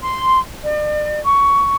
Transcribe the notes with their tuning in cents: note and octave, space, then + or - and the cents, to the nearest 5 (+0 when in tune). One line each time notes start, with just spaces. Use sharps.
C6 -5
D5 +40
C#6 +15